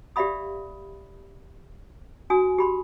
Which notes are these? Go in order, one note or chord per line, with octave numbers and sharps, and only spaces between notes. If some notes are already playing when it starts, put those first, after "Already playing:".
G4 D5 E5 F5 B5 D#6
D4 F#4 G#5 D#6
G4 B5 C6